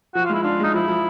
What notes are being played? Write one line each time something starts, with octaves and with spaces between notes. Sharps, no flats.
F3 F#4
F4
G#3 E4
D4 F4
G#3 D#4
F3 E4
F3